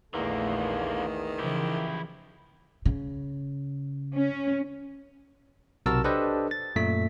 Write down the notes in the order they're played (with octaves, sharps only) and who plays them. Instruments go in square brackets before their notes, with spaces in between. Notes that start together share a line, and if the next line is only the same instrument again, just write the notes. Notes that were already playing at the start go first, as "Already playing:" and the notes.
[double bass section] A#1 A3 [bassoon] E2 [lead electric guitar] D3 A#3 [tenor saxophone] D#3
[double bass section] C#3 E3 F3 [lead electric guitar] E4 G4
[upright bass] C#3
[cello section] C#4
[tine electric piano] B1 C3 F#4 A#4 A5 E6
D4 G4 A4 B4 C5 D#5
A6
F#2 A#2 A3 B6